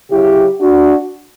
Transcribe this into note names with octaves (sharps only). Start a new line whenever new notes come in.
C#3 F#3 E4 G4
D4 F#4